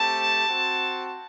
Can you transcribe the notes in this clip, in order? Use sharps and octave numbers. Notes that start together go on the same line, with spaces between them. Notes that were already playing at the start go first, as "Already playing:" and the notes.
Already playing: A3 C4 G4 A5
C4 F#4